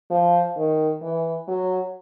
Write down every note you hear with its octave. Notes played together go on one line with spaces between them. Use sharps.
F3
D#3
E3
F#3